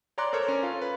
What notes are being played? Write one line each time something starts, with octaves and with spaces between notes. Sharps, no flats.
C#5 D5 A#5 C6 D6 F#6
A4 A#4 C5 C#5
C#4
F4
B4